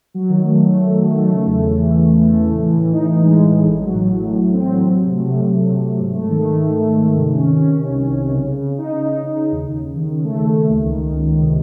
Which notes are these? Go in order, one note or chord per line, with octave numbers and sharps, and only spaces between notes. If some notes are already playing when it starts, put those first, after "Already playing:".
F#3
D#3
A3
A3
A3
F#3
D#3
A3
C#3
E2
E2
E3
A3
C#3
A3
A3
A2
E3
A2
D#4
D#4
G#3
A2
A2
A1
F#3
A2
F#3
A2
A2
C4
F#3
F#3
C3
A3
C3
C3
C3
C3
C3
G#2
A3
D#3
A3
D#3
A3
G#2
D#3
C3
C#4
C#4
C#4
C3
C2
C#4
C3
C#3
C#3
C#3
D#4
D#4
D#4
C#3
C#3
D#2
D#2
D#2
D#3
D#3
A3
D#2
D#2
C#2
D#3
D#3
C#2
D#3
C3